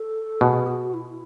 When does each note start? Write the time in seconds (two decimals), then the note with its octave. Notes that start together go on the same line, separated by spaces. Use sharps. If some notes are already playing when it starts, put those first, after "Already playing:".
Already playing: A4
0.41 B2 G#4
0.67 F#4
0.94 E4